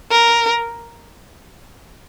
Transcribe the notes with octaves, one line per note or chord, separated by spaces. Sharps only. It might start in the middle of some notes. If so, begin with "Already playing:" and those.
A#4